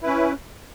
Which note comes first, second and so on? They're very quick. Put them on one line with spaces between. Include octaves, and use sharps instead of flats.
E4 B4 C#4